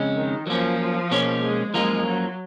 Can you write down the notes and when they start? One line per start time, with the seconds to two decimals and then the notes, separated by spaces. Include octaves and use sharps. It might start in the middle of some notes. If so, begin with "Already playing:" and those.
Already playing: F2 C#3 G#3 C#4
0.16 D#3
0.47 F3 F#3 A#3 C#4
1.11 B2 A#3 C#4 G#4 C#5
1.43 G#3
1.74 F#2 F3 G#3 A#3 F4 A#4
2.06 F#3